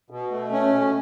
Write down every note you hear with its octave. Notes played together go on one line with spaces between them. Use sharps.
B2
A3
C#4
B2